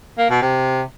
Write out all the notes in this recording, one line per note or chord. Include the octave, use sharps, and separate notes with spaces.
A#3
B2
C3